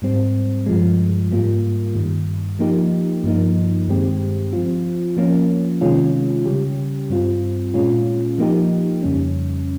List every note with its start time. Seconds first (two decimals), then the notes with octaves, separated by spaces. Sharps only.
0.02 G#2 G3 C4
0.66 G2 F3 G#3
1.31 G#2 G3 A#3 F4
1.95 G2 D#3 G3
2.59 F3 A#3 D#4 G4
3.23 G2 F3 A#3 D#4
3.88 G2 D#3 G#3 C4 G4
4.53 F3 C4 F4
5.17 F3 A#3 C#4
5.81 C3 D#3 G#3 C#4 F4
6.45 C#3 G3 C#4 G4
7.10 G2 G3 C4 F4
7.74 A#2 G#3 C#4 F4
8.38 F3 A#3 D#4 G4
9.03 F2 C#3 G3 C#4